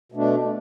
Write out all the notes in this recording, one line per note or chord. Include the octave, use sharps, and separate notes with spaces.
B2 A3 D4